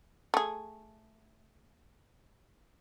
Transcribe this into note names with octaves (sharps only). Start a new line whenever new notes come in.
A3 G#4